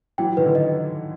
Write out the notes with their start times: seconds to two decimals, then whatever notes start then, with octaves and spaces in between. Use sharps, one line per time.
0.18 E3 F#3 G5
0.37 D#3 B4
0.45 D3
0.55 D#5